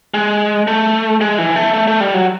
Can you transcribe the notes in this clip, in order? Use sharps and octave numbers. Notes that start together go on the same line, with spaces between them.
G#3
A3
G#3
E3
A3
A3
A3
G3
F#3